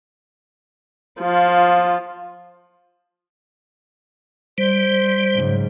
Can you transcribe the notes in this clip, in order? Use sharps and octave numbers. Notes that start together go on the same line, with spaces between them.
F3 F4
G3 C5
G#2 C#3 F#3